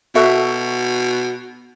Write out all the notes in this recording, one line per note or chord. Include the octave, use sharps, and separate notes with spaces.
B2 F#4 A4 E5